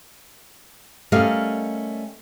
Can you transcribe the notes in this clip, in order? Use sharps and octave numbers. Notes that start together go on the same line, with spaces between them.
G3 A3 C#4 A#4 D#5 F5